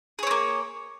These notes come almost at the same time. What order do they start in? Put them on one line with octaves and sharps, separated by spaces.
G#4 C#5 C4 A#3